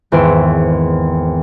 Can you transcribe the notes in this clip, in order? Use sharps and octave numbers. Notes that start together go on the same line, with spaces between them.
G#1 E2 C5 E5 D7